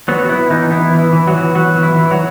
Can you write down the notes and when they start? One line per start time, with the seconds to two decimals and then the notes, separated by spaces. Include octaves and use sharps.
0.08 F#3 B3 F#4
0.23 F#4
0.29 B3 E4
0.50 E3 D#4
0.71 B3 E4
0.93 E3
0.99 E4
1.13 E3
1.27 F#3 F#4
1.34 E3
1.55 F#3 B3 F#4
1.76 E3
1.83 E4
1.97 E3
2.11 F#3 F#4